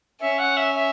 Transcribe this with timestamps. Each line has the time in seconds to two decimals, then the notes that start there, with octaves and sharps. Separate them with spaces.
0.20 C#4 E5
0.39 F#5
0.57 E5
0.75 E5